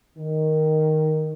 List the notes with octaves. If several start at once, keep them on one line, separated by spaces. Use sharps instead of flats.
D#3